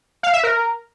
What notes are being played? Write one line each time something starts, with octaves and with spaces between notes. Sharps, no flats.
F5
E5
A#4